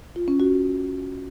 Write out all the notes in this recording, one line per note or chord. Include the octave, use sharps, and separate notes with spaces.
F4
C#4
F#4